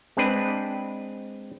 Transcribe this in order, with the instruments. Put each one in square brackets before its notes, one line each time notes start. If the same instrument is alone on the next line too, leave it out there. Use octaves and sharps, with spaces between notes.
[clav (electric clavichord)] G#3 C4 D4 B4